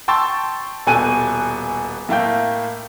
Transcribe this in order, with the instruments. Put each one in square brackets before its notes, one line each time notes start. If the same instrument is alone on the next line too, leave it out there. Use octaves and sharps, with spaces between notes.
[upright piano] G5 A5 C6 C#6 E6 A6
D#1 B2 A4 G#5 F#6 D#7
A2 A3 A#3 G5 G6